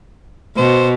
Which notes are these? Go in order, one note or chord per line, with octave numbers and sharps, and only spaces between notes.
B2 C5